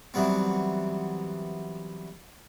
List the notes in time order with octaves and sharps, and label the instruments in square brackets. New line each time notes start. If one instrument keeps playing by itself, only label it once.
[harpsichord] E3 F#3 G3 B3 C4